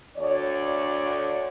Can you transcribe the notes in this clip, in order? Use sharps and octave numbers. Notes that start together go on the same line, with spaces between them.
D2 C#5 D5